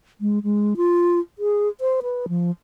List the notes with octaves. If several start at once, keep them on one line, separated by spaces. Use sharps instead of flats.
G#3
G#3
F4
G#4
C5
B4
F3